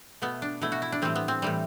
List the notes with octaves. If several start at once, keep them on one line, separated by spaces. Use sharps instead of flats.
B2 A3 B3
D4
B2 A3 E4
F#4
E4
D4
A2 E3 G3 C4
B3
C4
A2 E3 G3